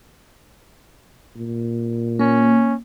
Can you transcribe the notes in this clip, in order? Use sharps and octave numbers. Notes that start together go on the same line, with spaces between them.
A#2
A#3 C#4